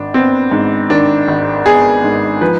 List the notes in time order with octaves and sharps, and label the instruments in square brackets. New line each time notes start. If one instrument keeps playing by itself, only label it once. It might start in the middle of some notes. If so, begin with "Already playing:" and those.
Already playing: [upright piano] G#1 D4
B3 C4
G#2
D#3 D4
G#1
B3 G#4
G#2
F3 B4